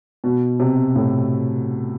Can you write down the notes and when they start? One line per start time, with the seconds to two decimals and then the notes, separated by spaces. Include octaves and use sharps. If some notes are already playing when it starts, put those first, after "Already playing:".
0.24 B2
0.59 C3
0.95 A2